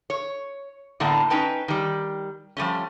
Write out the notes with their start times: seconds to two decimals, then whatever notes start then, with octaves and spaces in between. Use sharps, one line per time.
0.10 C#5
1.00 A2 D3 A#3 B3 D4
1.30 C#4 D#4 B4 G5 A5
1.68 D#3 G3
2.57 F3 G3 A3 C#4